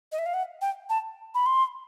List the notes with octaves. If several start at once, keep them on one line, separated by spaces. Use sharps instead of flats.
D#5
E5
F5
F#5
G5
A5
B5
C6